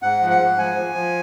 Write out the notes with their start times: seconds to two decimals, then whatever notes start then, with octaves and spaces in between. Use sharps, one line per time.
0.02 G#2 F#5
0.21 F3
0.30 F#5
0.39 G#2
0.58 F3 G#5
0.76 F3
0.95 F3